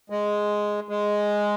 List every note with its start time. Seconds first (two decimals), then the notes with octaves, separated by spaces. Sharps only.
0.10 G#3
0.89 G#3